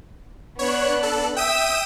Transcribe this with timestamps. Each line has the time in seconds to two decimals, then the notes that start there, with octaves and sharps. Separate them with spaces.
0.59 B3 D4 C#5 F#6
1.03 A4
1.36 E5 G5 D#6 E6 D#7